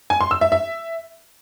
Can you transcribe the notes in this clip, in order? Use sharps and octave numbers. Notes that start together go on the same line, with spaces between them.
G#5
C6
E6
E5
E5